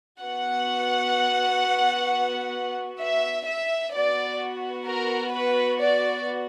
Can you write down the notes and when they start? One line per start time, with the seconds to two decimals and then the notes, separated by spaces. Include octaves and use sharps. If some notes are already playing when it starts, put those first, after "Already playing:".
0.21 B3 F#4 F#5
3.00 E5
3.47 E5
3.93 B3 F#4 D5
4.86 A#4
5.32 B4
5.79 D5